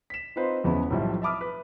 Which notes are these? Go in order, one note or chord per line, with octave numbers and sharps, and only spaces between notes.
B6 E7
C4 D#4 F4 B4 C5
E1 E2 B3 C#4 E5 B5
B1 A2 F3 G3 E5
E5 A5 B5 D6 D#6 F6
B4